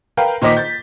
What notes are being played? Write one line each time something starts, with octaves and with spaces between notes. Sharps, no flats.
A#4 B4 F5 G5
A#2 D#3 C5 D#5 D6 B6
G6 A6